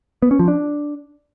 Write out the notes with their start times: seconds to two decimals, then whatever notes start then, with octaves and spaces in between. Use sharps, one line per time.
0.22 B3
0.31 C#4
0.39 F3
0.48 D4